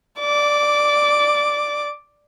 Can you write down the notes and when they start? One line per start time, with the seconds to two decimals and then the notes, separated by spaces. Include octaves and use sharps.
0.20 D5 D6